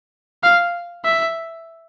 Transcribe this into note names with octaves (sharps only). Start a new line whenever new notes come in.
F5
E5